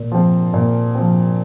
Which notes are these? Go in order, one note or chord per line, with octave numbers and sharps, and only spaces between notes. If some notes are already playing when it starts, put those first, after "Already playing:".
Already playing: A#2
F3 C4
A#2
F3 C4